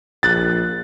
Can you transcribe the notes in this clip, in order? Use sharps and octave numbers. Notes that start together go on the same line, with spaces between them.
A#1 F#6 A6